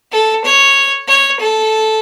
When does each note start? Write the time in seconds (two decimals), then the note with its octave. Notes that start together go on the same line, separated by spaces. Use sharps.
0.12 A4
0.44 C#5
1.08 C#5
1.40 A4